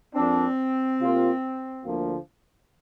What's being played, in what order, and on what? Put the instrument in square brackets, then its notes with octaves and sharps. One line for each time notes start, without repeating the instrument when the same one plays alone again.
[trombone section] F2 F3 A#3 D4 [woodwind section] C4
[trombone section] C3 A#3 F4
D2 D3 F3 A#3 F4